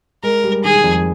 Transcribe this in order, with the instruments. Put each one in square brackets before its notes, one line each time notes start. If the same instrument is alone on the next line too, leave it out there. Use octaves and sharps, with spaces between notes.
[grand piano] G#3 [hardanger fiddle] A#4
[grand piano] G3
[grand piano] D#3 [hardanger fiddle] G#4
[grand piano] D#3
F2